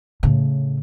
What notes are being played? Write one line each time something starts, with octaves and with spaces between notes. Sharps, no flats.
A2 C#3